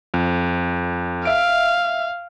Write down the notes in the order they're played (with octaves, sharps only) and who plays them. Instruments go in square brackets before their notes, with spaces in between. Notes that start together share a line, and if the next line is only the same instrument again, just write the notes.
[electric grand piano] F2
[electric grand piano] E5 D7 [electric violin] F5